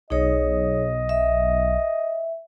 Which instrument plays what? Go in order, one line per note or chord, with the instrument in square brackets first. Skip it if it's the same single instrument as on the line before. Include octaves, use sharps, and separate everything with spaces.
[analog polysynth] B1 [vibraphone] D#4 G#4 C#5 [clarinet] D#5
[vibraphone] E5